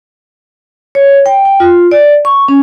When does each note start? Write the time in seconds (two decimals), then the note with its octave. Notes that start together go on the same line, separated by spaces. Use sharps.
0.95 C#5
1.26 G5
1.45 G5
1.60 F4
1.91 D5
2.25 C#6
2.48 C#4